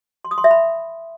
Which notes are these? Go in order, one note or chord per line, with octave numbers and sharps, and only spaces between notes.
C6
D#6
C6
E5
B5